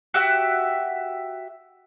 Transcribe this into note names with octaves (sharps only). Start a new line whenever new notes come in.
F#4 G4 E5 F#5